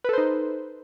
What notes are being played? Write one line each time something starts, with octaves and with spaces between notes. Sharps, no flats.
D#4 A4 B4 C5